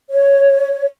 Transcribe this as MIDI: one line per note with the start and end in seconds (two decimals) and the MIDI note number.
0.11 0.86 73